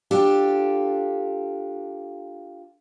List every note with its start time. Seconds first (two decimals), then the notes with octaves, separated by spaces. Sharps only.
0.11 D4 F4 G4 A4